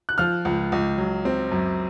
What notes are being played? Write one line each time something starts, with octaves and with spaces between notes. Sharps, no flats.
F#6
F3 F6
C#2
C#2
F#3
C4
F#2